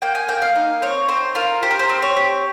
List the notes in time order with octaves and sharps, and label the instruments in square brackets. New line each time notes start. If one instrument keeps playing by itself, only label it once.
[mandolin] A#3 G5
G#5
A#3 G5
F5
D#4
C4 C#5
C4 C5
F4 A#4
G4 C5
A#4
C5
C4
C#5
G4